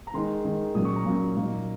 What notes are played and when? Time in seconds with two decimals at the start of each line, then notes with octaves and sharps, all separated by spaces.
0.07 A#5
0.14 D#3 G#3 D#4 C6
0.44 D#3 G#3 D#4
0.75 A#2 F#3 A#3 C#4 D#6
0.85 C#6
0.96 A#5
1.05 A#2 F#3 A#3 C#4
1.36 A#2 F#3 A#3 D#4